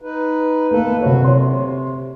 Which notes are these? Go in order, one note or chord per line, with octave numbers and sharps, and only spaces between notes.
D#4 B4
A3 A#3 A4 B4
C3 F#3 F#4 C#5
C3 C#5 C6